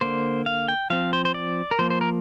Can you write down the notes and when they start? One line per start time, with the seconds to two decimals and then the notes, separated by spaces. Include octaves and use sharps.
0.01 D3 A#3 C5
0.46 F5
0.68 G5
0.90 F3 C4 F5
1.13 C5
1.25 C5
1.34 D5
1.71 A#4
1.79 F3 A#3 C5
1.90 C5
2.01 A#4